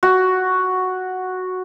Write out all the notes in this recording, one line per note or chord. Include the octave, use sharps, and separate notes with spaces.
F#4